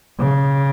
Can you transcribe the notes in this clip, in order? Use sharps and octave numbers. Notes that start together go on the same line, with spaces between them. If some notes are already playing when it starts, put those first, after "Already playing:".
C#3